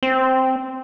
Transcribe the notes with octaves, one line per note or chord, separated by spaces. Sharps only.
C4